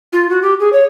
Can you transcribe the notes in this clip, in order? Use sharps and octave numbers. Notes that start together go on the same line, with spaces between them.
F4
F#4
G4
G#4
C#5